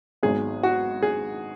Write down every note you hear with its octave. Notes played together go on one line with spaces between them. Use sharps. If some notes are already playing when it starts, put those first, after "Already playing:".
G#1 G#2 F#3 B3 G#4
F#4
G#4